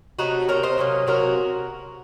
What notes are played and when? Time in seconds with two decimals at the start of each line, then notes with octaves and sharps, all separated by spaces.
0.19 C3 F#3 A3 D#4 F#4
0.48 C3 F#3 A3 A#4 C#5
0.63 C5 D#5
0.78 C3 F#3 A#3 C#4
1.07 C3 F#3 A#3 C#4 F#4 A#4